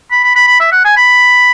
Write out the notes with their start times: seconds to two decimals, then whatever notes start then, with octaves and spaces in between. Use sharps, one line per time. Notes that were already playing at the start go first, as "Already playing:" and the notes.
0.11 B5
0.24 B5
0.35 B5
0.47 B5
0.60 E5
0.72 F#5
0.85 G#5
0.97 B5